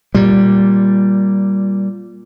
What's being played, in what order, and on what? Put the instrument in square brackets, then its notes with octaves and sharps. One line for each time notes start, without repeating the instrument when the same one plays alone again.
[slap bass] A#2 G3